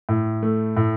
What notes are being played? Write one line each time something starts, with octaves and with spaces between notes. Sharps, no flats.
A2
A3
A2